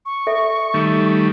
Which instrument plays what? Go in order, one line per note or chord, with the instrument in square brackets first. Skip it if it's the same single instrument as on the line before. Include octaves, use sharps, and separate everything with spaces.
[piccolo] C#6
[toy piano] A4 E5
[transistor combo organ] D#3 G3 A3